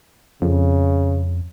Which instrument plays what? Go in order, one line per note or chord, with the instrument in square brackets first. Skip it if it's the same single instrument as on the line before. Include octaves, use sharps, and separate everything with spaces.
[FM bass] F2 [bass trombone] C#3